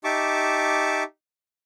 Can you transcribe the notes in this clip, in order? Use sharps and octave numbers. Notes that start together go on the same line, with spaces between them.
D#4 G4 E5 A5 C#6 D6